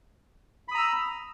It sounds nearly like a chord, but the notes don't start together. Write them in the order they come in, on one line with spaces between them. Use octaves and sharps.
B5 D#6 A#5 E6